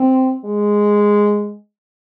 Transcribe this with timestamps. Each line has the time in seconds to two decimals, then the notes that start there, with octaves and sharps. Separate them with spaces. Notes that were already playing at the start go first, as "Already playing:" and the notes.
Already playing: C4
0.45 G#3